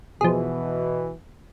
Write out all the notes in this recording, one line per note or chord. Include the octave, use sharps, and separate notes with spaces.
B2 E3 F3 G#4